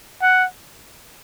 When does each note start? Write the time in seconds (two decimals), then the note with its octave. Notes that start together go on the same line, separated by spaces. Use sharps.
0.22 F#5